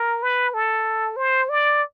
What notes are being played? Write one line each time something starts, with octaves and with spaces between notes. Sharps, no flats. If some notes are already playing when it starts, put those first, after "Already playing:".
Already playing: A#4
B4
A4
C5
D5